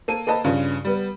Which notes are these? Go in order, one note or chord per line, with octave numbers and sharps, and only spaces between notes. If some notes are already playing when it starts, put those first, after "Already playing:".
A#3 A4 D#7
A#3 A4 B4 D#5 A5
G2 C#3 C#4 F4
G3 B3